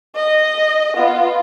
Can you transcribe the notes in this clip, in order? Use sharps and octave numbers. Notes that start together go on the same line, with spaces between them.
D#5
B3 F4